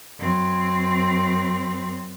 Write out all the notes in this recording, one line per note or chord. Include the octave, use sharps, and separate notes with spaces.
F#2 C4